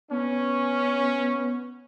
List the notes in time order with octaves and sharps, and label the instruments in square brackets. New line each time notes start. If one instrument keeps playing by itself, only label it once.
[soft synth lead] B3 [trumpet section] C#4